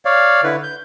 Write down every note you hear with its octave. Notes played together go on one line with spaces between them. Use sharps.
C#5 D5 F5
D3 E4 B4
G6